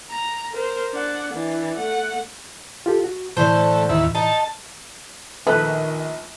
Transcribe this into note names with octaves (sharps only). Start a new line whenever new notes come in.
A#5
A#4 C5
D4 F#5
E3 D4
A3 F#5
F4 G4 A4
F#4
A2 D3 E3 A3 C5
D#2 E4
D#4 A5
A#1 D#3 A3 B4